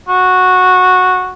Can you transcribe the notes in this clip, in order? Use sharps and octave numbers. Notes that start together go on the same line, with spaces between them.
F#4